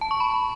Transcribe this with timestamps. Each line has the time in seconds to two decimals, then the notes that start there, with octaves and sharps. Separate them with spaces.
0.01 A5
0.11 C#6
0.20 B5